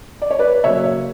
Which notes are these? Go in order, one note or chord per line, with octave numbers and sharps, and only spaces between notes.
D5
C#5
B4 D5
C#3 F#3 A#3 C#5 E5